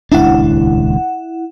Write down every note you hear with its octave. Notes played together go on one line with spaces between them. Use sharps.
D#1 C#2 D4 E4 F#5